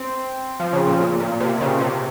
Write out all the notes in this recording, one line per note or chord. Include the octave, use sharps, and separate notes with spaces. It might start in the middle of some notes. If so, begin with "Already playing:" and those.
Already playing: C4
F3
C#3
A#2
A#2
A#2
C3
C#3
C3